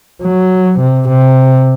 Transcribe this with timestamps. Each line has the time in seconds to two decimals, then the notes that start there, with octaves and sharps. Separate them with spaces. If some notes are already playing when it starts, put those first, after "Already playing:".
0.22 F#3
0.79 C3
1.08 C3